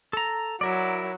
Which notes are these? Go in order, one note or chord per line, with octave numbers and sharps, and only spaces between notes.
A4 A#5
F#3 E4 A#4 D5